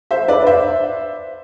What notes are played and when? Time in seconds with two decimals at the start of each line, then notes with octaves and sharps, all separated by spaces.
0.11 C5 E5
0.28 B4 D5
0.47 C5 E5